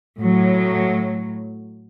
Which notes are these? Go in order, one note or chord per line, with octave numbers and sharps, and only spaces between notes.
A2 F#3